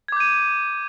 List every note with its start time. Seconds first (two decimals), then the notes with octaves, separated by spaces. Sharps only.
0.08 G#6
0.12 D6
0.16 G6
0.20 D#7